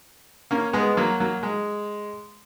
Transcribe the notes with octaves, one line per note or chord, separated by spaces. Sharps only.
A#3 C#4
G#3 B3
F#3 A#3
F#3 A#3
G#3